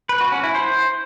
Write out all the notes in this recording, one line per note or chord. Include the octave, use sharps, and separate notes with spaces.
B4
F#4
C#4
E4
C5